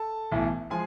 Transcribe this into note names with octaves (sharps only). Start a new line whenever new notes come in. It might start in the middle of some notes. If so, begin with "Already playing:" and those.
Already playing: A4 A5
B1 A2 E3
F3 G#3 G#4 G#5